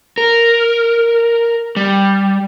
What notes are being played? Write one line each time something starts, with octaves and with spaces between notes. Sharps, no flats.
A#4
G3